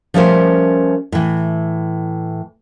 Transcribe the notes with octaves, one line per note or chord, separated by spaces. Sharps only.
F3 G3 A3 C#4 A#4 C5
A2 E3